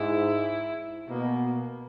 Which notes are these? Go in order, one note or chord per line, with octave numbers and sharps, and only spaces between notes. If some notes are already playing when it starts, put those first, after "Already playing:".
Already playing: G#2 E4
B2 A#3